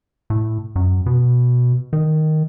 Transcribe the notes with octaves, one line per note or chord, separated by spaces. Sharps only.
A2
F#2
B2
D#3